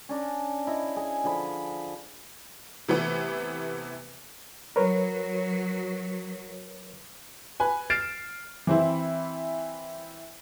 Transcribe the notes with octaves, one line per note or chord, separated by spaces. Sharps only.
C#4 D4 A#5
E4 D#5
G#4 G#5
D3 F3 G#4 B5
C3 E3 A3 B3
F#3 A#4 B4 C#5
B4 G#5
F6 A6 C7 D7 E7
E3 C4 E4